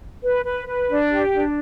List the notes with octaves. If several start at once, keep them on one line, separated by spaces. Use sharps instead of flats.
B4
B4
B4
D4
G4
D4